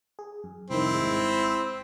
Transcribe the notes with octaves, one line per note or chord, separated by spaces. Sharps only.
G#4
F#2
C2 F2 D#3 C4 E4
G#1 G#3